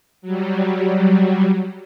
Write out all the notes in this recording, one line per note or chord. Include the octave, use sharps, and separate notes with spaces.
F#3 G3